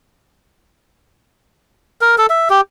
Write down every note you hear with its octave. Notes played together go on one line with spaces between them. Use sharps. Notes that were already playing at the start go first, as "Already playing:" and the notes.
A#4
A4
E5
G4